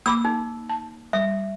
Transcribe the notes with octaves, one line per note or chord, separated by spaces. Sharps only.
A#3 B5 D6 E6
D#4
A5
G3 E5